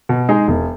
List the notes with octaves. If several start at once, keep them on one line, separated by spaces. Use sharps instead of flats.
B2
G#3 D#4 G#4
E1